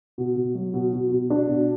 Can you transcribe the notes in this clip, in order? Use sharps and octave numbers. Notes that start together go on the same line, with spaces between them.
B2
B2
F#3
B2
B2
B2
D4
B2